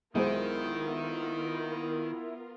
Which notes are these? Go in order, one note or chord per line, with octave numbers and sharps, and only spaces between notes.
B1 D#3 G#3 B3 E4 F4 A#4 C5